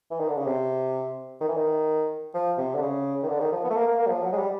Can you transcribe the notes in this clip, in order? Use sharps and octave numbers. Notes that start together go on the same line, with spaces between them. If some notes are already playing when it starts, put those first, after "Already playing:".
E3
D#3
D3
C#3
C3
D#3
E3
D#3
F3
C3
D3
C#3
D#3
D3
D#3
F3
B3
A3
A#3
A#3
A#3
F#3
F3
F#3
G#3
G3